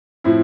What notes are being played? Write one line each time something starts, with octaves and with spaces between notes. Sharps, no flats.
A2 F3 C4 E4